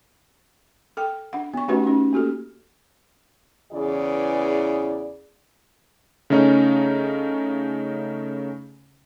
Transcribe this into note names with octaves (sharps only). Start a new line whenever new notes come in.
A4 G5
D4 F#5
B3 C#6
A3 C#4 D#4 F#4 G4 B4
C#4 D#4
A#3 F#4 G4 A4
E2 C#3 E3 E4 G#4 D5
C#3 A3 C#4 D#4